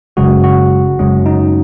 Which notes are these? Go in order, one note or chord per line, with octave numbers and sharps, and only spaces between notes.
F#1 F#2 C#3 G#3 F#4
F#4
F#1 F#2 C#3 G#3 C#4
D#4